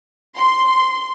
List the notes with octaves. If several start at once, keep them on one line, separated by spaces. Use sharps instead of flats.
C6